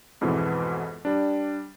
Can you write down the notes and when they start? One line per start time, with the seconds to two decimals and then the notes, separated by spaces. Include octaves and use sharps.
0.21 F2 G#2 B2 E3
1.05 G3 D4